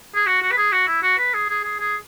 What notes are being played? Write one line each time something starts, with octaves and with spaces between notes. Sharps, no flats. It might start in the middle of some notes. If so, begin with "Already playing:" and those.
G#4
F#4
F#4
B4
G#4
F#4
E4
F#4
B4
G#4
G#4
G#4
G#4